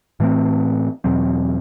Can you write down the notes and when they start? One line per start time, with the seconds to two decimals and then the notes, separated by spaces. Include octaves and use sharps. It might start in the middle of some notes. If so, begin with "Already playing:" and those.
0.20 A2 E3 A3 C4
1.04 E2 B2 F#3 C4